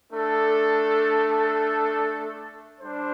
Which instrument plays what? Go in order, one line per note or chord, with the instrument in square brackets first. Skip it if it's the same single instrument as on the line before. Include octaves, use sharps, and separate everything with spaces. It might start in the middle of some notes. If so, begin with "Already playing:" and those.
[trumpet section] A3 D4 A4
G3 D4 C5